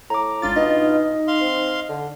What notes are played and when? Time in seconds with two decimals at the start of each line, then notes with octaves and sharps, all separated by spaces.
0.10 A2 A#5 D6
0.42 G#1 D4 F4 A6
0.56 B2 D#4 D#5
1.28 F5 C6
1.41 C4
1.89 D3